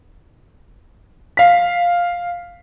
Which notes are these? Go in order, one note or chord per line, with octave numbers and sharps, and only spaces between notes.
F5 B6